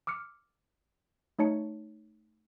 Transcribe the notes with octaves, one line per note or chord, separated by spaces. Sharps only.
D6 E6 F6 C#7
A3 D#4 C#5 A5 C#7